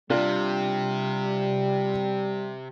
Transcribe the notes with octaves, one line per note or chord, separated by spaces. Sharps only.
C3 G3 D4 F4